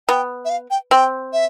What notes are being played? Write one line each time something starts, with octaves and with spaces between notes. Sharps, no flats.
B3 G5
E5
F5
G5
C4 G5
E5